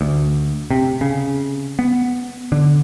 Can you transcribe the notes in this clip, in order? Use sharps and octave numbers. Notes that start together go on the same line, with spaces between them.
D2
C3
C#3
B3
D3